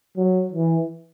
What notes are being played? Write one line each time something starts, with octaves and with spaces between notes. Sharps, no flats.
F#3
E3